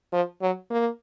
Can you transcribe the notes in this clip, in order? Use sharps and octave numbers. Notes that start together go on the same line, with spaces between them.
F3
F#3
A#3